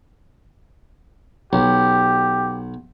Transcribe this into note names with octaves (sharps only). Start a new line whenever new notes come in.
B1 G4